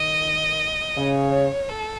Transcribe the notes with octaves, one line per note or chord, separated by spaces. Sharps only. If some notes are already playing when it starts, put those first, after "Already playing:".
Already playing: D#3 D#5
C#3 C#5
A4